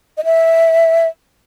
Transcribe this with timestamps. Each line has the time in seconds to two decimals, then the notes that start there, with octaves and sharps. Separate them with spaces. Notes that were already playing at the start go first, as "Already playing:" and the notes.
0.18 D#5
0.25 E5